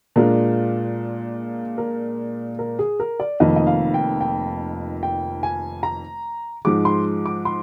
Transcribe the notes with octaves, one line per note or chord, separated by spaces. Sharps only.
A#2 G#3 D4 F4 A#4
A#4
A#4
G#4
A#4
D5
F1 F2 D#3 A#3 D#5
D#5
F5
G5
G5
G5
G#5
A#5
G#2 F3 G#3 D6
C6
D6
C6